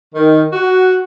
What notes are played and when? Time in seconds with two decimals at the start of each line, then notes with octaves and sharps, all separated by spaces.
0.14 D#3
0.53 F#4